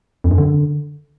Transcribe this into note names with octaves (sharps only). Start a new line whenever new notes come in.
F2
F#2
D3